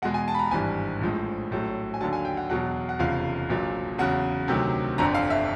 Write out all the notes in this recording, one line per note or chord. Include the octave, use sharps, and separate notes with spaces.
E2 B2 G#3 F#5
G#5
A5
B5
A#5
G#1 G2 E3 G3 G#5
A#1 A2 F3 G#3
A#1 A2 F#3
G#5
D#2 D3 F#3 A5
G#5
G5
F#5
E2 B2 F#3 F#5
F#5
F1 E2 C#3 F3 F5
A#1 A#2 F#3
E2 C#3 F#3 F#5
D2 C3 D#3 F#3
G1 F2 D3 A#5
F5
E5